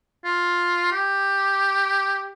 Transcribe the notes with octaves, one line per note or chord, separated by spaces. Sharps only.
F4
G4